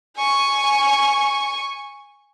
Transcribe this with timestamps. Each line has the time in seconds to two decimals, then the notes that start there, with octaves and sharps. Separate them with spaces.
0.17 G#5 C#6